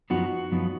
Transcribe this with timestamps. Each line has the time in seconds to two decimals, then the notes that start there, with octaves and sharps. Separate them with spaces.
0.10 F#2 F3 B3 D#4 F#4
0.52 F#2 F3 B3 D#4